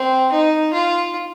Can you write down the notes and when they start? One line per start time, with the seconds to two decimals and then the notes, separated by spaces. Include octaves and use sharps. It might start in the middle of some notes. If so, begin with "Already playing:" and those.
Already playing: C4
0.32 D#4
0.73 F4